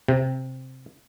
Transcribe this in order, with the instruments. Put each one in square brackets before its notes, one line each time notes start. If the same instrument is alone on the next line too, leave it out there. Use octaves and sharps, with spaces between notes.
[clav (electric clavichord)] C3